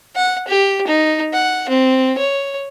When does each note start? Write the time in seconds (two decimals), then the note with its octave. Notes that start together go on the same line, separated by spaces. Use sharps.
0.16 F#5
0.47 G4
0.87 D#4
1.33 F#5
1.69 C4
2.18 C#5